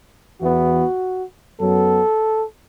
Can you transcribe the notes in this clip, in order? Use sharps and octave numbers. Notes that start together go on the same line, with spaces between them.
E2 E3 B3 F#4
F#2 F#3 B3 A4